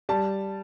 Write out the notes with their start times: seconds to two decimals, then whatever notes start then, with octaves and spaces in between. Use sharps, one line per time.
0.09 G3 A5